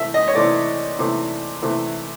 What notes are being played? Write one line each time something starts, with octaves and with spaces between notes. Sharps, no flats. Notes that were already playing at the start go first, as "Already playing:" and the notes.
Already playing: C3 E3 A3 E5
D#5
C#5
C3 E3 A3 D5
C3 E3 A3
C3 E3 A3